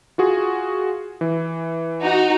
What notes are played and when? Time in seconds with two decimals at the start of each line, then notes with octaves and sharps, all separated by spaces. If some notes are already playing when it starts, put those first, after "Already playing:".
0.18 F4 F#4 G#4
1.21 E3
2.02 D#4 F#4